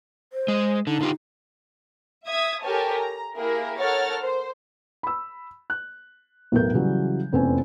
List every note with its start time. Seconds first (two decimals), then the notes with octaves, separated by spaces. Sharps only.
0.33 C5
0.48 G#3
0.87 D3 D#4
1.01 D3 F4 G4
2.25 E5 D#6 G#6
2.62 G4 A4 A#4 C#5 G#5 A5
2.95 A#5
3.35 A#3 E4 G4 G#4 A#4
3.78 A4 A#4 C#5 F#5 F6 A6
4.22 C5
5.03 B5 E6
5.70 F#6
6.52 B1 E2 A2 A#4 G6
6.74 C#3 E3 F#3 G3
7.32 F1 E2 C4 C#4 G#5